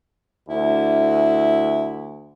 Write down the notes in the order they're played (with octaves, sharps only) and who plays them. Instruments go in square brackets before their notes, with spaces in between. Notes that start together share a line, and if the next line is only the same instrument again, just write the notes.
[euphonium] D2 [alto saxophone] E4